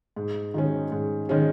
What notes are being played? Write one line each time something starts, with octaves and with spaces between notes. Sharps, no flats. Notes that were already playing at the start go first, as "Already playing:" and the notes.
G#2
D#3 G#3 C#4
G#2
D#3 G#3 C#4